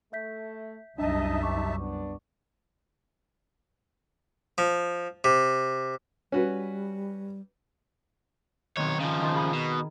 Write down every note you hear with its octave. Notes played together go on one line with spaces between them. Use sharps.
A3 E5 G6 B6
C2 F#2 G3 D4 D#4 D#5 E5 A5
C3 C#6 D6
B3 D4
F3
C3
G3 C#4 F#4 B4
B1 D#3 C4 C#5
C#3 F3
D#3 A5 C6
G#4 B5 D#6
B2